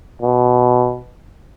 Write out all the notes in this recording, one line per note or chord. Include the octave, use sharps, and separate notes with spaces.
B2